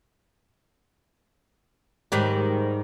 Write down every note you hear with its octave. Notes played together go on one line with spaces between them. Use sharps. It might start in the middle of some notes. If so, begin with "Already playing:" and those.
G#2 D#3 G3